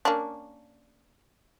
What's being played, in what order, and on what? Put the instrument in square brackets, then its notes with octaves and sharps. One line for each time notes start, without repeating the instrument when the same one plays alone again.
[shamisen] A#3 C#4 D4